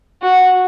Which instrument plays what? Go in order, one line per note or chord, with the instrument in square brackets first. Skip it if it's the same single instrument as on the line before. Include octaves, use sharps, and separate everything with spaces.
[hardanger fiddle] F#4